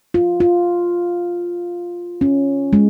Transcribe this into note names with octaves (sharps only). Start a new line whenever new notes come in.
F4
F4
C#4
G#3